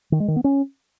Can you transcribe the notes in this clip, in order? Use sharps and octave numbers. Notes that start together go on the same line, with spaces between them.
D#3
G#3
D#3
B3
C#4